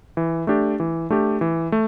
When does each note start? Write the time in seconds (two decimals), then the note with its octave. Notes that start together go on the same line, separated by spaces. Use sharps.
0.17 E3
0.47 A3 D4 G4
0.80 E3
1.10 A3 D4 G4
1.41 E3
1.72 A3